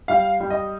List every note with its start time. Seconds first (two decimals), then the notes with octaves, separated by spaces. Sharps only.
0.08 G3 F5
0.40 G3
0.50 D#5